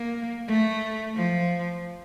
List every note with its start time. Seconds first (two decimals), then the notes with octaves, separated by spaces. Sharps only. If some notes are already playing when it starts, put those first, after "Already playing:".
Already playing: A#3
0.47 A3
1.16 F3